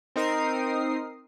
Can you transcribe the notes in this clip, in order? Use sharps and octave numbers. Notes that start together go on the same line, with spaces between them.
C4 D#4 A#4 D#6 C7